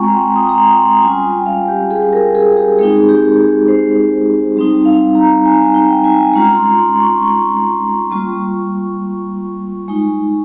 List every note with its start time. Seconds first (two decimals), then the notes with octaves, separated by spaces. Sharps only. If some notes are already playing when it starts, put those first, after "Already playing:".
Already playing: G#3 C4 F4 G5 G#5 A#5 C#6
0.14 C6
0.36 D#6
0.49 A#5
0.58 C6
0.80 C6
1.02 G3 C#4 F4 G#5
1.24 G5
1.46 F5
1.68 G4
1.91 G#4
2.02 G#4
2.13 A#4
2.35 G#4
2.57 G4
2.79 G#3 C4 D#4 G#4
3.09 G4
3.38 G#4
3.68 C5
4.57 G3 C4 D#4
4.85 F5
5.15 A#5
5.45 G#5
5.74 G5
6.04 G#5
6.33 G#3 C#4 F4 A#5
6.55 C6
6.78 C6
7.00 C#6
7.23 C#6
8.11 G3 A#3 F4 C#6
9.88 G#3 D#4